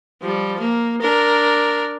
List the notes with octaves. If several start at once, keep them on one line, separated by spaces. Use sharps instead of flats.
F3 G3
A#3
D4 A#4